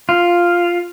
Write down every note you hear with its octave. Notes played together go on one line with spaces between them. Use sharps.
F4